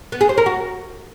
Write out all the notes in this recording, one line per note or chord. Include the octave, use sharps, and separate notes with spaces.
B3
G#4
C5
A#4
F#4